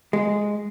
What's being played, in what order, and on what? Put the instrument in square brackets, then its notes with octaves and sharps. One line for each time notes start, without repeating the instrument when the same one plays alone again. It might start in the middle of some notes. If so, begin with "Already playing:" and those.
[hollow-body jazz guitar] G#3